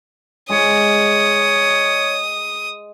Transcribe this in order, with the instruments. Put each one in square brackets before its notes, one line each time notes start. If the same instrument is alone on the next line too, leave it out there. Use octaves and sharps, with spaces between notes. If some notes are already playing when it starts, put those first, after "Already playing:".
[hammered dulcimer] G#3 [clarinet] C#5 [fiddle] D#6